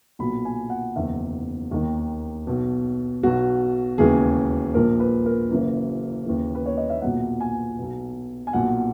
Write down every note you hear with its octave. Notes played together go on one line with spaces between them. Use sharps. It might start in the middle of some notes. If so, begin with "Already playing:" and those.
B1 A#2 B5
G#5
F#5
F#1 E2 D#3 E5
D#2 D#3
B1 B2
B1 B2 F#4
E1 D#2 C#3 E3 G#4
A#1 A#2 A#4
B4
A#4
F#1 F#2 E3
D#2 C#3 E3
B4
C#5
D#5
E5
B1 A#2 F#5
G#5
B1 B2
G#5
B1 A#2 F#5